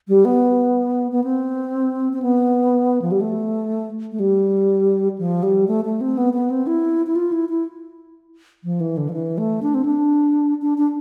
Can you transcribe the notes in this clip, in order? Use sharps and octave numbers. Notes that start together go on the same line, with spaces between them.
G3
B3
B3
C4
C4
B3
F3
G3
A3
A3
G3
F3
G3
A3
A3
C4
B3
B3
C4
E4
E4
F4
E4
E4
F3
E3
D3
F3
E3
A3
D4
C4
D4
D4
D4